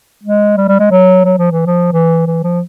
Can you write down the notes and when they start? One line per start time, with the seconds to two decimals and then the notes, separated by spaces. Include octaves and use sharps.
0.24 G#3
0.57 G3
0.68 G3
0.80 G#3
0.91 F#3
1.25 F#3
1.38 F3
1.52 E3
1.66 F3
1.93 E3
2.27 E3
2.43 F3